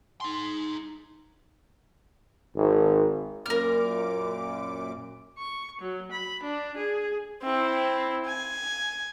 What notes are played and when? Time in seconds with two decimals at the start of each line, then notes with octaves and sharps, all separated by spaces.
0.21 D#4 C6
2.56 G#1
3.46 F#2 A#2 A#4 D6 F6
5.38 C#6
5.81 F#3
6.11 B5
6.42 D4
6.76 G#4
7.43 C4 E4
8.25 G#5